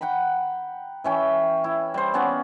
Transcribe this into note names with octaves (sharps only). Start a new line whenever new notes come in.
F#5 G5 A#5 B5
E3 C#4 G5
E4
G3 C5
B3 C#4 D5 F5